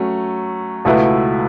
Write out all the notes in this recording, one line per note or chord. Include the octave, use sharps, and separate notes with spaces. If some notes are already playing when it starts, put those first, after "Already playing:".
Already playing: F#3 A3 C#4
C#2 B2 A3 E4 B4